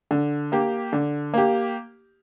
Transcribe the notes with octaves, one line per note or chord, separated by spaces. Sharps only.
D3
A#3 G4
D3
A#3 G4